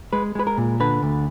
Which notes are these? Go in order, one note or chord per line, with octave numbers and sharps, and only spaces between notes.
G#3 B4
G#3 B4
A#4
A#2
D3 B4
D2